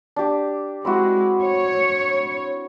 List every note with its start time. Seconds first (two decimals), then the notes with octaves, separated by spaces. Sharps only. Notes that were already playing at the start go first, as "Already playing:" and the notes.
0.16 D4 G4
0.85 G#3 C4 E4 F#4
1.42 C#5